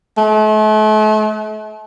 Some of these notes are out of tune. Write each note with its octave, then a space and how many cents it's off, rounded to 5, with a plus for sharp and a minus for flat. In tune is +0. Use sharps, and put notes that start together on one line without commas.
A3 -40